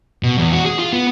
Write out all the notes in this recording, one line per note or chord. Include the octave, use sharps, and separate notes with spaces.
B2
E2
F#4
G#4
F4
B3